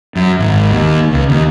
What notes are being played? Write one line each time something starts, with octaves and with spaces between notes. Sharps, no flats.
F#2
G#1
D#2
C#2
D#2